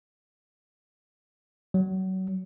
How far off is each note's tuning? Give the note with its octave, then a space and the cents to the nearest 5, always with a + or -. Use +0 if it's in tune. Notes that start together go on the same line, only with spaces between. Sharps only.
F#3 +30